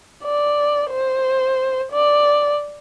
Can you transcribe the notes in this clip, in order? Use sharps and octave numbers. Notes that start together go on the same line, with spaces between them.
D5
C5
D5